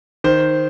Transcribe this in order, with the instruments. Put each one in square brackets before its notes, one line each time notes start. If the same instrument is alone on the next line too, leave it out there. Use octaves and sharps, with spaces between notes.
[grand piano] D#3 C5